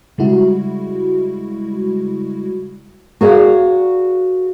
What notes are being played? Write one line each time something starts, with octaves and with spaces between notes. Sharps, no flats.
C#3 G3 G#3 E4 F#4
F#4 G#4 A#4 D5 F5